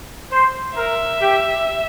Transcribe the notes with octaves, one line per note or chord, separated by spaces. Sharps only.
C5
A#4 E5
G4